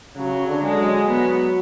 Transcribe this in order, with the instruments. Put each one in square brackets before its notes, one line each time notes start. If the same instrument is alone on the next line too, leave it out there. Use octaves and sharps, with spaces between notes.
[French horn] C#3 [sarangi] F#3
[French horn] D3
[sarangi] G#3
[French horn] F#3
[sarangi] B3